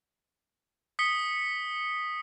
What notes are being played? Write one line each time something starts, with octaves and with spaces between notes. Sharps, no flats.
D#6 B6 C#7 G7